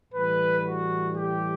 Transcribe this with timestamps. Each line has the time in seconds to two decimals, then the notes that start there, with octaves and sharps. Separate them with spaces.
0.13 A2 E3 G3 B4
0.63 F#4
1.15 G4